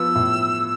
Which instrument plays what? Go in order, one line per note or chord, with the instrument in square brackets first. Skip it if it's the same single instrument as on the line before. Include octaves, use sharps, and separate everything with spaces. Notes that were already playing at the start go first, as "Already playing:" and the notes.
Already playing: [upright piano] F3 B3 [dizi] E6
[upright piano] A2